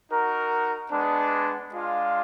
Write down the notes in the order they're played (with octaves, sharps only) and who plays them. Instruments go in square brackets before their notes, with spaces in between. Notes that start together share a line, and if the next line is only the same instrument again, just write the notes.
[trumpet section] D#4 F#4 A#4
G#3 B3 D4
G#3 D4 F4